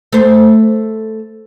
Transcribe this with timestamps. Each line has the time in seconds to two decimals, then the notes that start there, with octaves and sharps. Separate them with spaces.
0.13 A3 C5